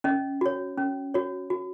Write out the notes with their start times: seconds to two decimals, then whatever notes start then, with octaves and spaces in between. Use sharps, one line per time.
0.04 C#4 D#5
0.41 F#4 C#5
0.78 C#4
1.14 F#4 C#5
1.50 F#4